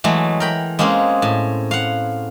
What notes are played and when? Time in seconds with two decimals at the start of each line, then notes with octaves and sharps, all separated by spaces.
0.04 E3 F#3 G#3 A3
0.40 A#4 G5 B5
0.79 G#3 A#3 C4 C#4 G#4
1.22 A2
1.71 F5 F#5